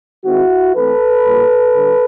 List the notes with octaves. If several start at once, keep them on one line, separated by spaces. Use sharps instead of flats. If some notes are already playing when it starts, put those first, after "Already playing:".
D#3 G#3 C4 E4 F#4
E3 A3 C4 A4 B4
A#2 G3 A#3
D3 G3